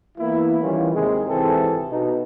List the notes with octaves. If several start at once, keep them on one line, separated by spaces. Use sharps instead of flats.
E3 A#3 B3 E4
D#3 E3 G3 C#4 F4
D#2 C3 D#3 G#3
G#1 C3 E3 C4 G#4 A4
B2 D#4